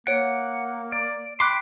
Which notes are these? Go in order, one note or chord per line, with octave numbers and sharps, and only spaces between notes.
A#3 C#5 F#5 D7
D5
G5 B5 C6 D6 F#6